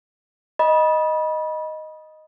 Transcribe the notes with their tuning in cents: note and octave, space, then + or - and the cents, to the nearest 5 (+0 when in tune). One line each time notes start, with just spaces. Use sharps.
D#5 +0 B5 -30